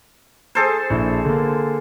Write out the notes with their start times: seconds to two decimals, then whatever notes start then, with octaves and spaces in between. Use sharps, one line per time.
0.55 G#4 A4 C5
0.90 A#1 E4
1.25 D3 A#3